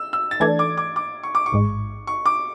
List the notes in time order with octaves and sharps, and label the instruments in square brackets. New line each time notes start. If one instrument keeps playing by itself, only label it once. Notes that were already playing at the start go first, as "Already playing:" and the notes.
Already playing: [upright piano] E6
E6
A6
[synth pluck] E3 A3 D4 A4 D5 [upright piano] G#6
[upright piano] D6
D6
D6
C#6
D6
C#6
[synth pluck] A1 G#2 G#3
[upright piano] C#6
D6